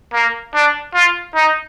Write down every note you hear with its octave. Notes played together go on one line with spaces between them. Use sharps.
A#3
D4
F4
D#4